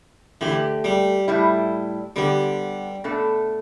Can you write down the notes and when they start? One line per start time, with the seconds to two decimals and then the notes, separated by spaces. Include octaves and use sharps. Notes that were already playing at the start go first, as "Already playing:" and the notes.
0.41 D3 E3 A3 G4
0.84 G3
1.28 A2 G3 E4
2.16 D3 G3 B3 G4
3.04 B2 A3 D4 A4